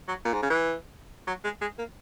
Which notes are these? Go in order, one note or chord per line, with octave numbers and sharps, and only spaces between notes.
F#3
A#2
G#2
C#3
E3
F#3
G#3
G#3
A#3